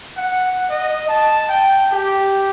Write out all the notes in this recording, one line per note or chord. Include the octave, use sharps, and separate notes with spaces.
F#5
D#5
A5
G5
G4